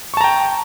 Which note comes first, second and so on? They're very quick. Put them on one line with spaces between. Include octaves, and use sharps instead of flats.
C#6 A5 A#5 G5